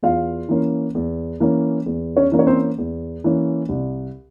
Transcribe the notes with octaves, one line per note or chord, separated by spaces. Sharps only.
E2 F4 F5
E3 A#3 C#4
E2
E3 A#3 C#4
E2
C#4 C#5
E3 A#3 C#4
C#5
C4 C5
E2
E3 A#3 C#4
C2